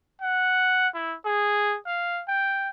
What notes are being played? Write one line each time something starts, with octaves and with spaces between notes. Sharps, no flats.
F#5
E4
G#4
F5
G5